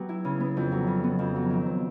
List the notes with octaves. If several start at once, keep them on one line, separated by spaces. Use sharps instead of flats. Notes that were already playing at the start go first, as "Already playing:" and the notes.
Already playing: F#3 B3 G4
E4
C#3
B3
F2
F#3
C#3
B3
F2
F#3
D#3
C4